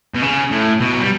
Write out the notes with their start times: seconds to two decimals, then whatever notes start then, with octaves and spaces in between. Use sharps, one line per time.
0.14 B2
0.22 C#3
0.51 A2
0.80 B2
0.93 F#3
1.01 G3